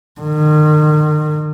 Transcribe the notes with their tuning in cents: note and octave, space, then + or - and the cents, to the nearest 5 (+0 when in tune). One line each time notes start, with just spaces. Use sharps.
D#3 -40